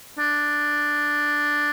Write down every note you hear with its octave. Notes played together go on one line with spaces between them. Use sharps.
D4